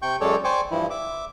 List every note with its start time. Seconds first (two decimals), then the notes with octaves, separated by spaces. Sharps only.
0.02 C3 G5 C#6 G6
0.21 F#2 G#3 A4 C#5 D5
0.44 C5 D5 G5 G#5 C#6 D6
0.71 G2 E3 F3 E4
0.90 E5 D6